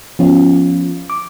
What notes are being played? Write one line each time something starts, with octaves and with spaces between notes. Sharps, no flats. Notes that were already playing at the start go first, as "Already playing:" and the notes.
F3 B3 C#4 F4
D6